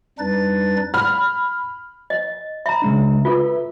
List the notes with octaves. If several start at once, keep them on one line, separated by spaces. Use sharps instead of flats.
F2 G3 D4 D#4 B4 A6
B5 F6
D#5
E5 A#5 B5
C#3 G#3 D4
F4 A4 B4 E5